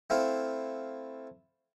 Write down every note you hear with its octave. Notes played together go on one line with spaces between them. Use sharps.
A3 C4 E4 F5